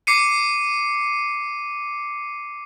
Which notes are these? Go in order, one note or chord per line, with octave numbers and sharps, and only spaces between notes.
D6 C7 C#7 D#7